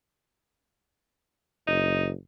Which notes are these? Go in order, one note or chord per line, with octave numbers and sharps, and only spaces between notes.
F#1 D#4